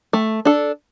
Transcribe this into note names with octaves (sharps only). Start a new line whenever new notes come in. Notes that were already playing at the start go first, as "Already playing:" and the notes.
A3
D4 A4